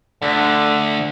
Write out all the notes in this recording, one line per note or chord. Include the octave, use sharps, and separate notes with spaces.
D2 D3